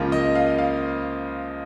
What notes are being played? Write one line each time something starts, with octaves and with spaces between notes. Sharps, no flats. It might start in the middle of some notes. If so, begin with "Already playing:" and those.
Already playing: C#2 C#3 F3 A#3
D#5
F5
F5